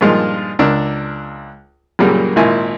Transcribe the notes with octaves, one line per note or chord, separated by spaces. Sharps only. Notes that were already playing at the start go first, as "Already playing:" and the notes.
G2 A#2 D#3 F3 G#3 F4
C#2 D4 A#4 E6
F#2 A#2 C#3 F#3 G3 A#3
G#1 A#2 E4 G#5